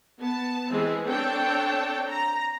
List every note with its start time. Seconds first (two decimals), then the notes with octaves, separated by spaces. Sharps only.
0.19 B3 A5
0.69 E3 G#3 C4 G#4
1.06 C4 D4 A4 C#5 G5 A5
2.05 A#5